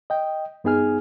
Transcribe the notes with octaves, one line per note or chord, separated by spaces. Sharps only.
D#5 G5
G2 B3 D#4 G#4 G#5 F6